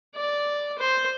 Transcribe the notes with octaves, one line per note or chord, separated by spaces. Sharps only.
D5
C5